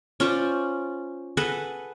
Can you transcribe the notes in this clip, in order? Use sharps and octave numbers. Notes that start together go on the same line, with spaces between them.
C#4 F4 C5 D5
G#4 A4 B4 F#5